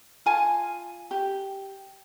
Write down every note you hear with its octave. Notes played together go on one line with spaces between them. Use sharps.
F4 G#5 A5
G4